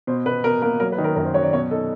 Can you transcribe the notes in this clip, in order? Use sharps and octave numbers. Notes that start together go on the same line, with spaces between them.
B2 C5
B2 B4
B2 A#4
A#3 A#4
F#3 A#4
B4
D#3
A#4
F#2 A#4
C5
F#3 C#5
D5
B2 C#5
D#4 A4